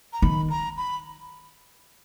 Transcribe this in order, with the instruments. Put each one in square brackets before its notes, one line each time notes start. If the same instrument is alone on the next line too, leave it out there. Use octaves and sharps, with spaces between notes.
[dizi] A#5
[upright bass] D#3 [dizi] B5
[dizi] A#5
B5